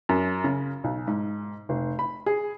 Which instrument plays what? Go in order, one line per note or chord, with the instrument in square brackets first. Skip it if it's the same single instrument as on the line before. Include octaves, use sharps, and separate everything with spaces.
[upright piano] F#2
C#3
B1
G#2
F1
B5
G#4